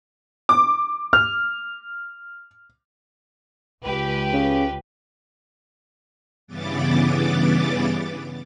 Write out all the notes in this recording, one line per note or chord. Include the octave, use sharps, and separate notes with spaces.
D6
F6
C#2 G4 B4
C#3
G2 C#3 E3 B3 D6 A6